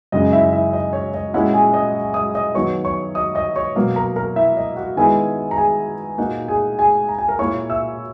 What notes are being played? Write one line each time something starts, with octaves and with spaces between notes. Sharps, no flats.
F#2 C#3 G#3 D#4 D#5
E4 E5
E4 E5
D#5
C#5
D#5
A#2 G#3 C#4 E4 F#4 F#5
G#4 G#5
D#5 D#6
D#5 D#6
D#5 D#6
D#3 F#3 B3 C#5 C#6
C#5 C#6
D#5 D#6
D#5 D#6
C#5 C#6
B2 F#3 A#3
A#4 A#5
A#4 A#5
E4 E5
D#5
F#4 F#5
D#3 G#3 B3 E4 G#4 G#5
A#5
G#4 G#5
A#2 A#3 D#4 F#4 F#5
G#4 G#5
G#4 G#5
A#5
G#5
A#4 A#5
A#2 A#3 E4 C#5 C#6
E5 E6